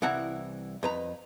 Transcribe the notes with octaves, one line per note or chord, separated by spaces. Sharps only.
C2 E3 E4 F#5 A#5
F2 B4 A#5